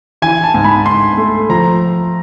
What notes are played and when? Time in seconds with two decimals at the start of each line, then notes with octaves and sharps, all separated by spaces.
0.22 E3 G#5
0.44 A5
0.54 G#2
0.64 B5
0.86 G#2 C6
1.17 A3
1.49 F3 A#5